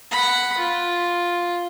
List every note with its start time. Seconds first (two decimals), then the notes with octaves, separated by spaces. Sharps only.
0.11 F#5 B5
0.57 F4